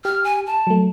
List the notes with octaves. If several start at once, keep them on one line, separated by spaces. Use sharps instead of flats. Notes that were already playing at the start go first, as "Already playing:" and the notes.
G4 F6
G#5
A5
F#3 A3